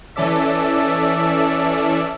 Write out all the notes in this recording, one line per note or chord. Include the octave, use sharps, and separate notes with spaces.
E3 C#4 A4 D5 E5